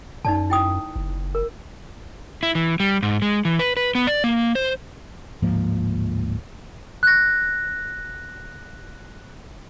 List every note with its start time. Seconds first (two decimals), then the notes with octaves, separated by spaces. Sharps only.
0.25 F#2 D#4 D5 A5
0.50 E4 G5 D#6
0.96 F#1
1.35 A#4
2.43 E4
2.55 E3
2.80 G3
3.03 G#2
3.22 G#3
3.45 E3
3.59 B4
3.77 B4
3.95 B3
4.07 D5
4.24 A#3
4.55 C5
5.42 D1 G#2 F3 A#3
7.03 F#6 A#6